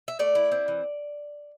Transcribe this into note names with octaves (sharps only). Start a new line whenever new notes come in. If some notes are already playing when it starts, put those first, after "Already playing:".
E5
A3 D5
E4
C4
E3